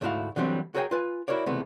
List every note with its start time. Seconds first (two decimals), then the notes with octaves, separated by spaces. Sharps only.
0.01 D2 G#2 A3 E4 F#4 F5
0.36 D3 E3 F#3 G3 C4
0.75 F#4 G#4 A#4 C#5 G5 G#5
0.91 F4 B4 G#5
1.28 E4 F#4 A#4 C#5 D5
1.46 C#2 C3 E3 A3 B3